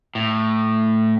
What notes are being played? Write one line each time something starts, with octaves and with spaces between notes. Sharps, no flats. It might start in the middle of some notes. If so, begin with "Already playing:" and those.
A2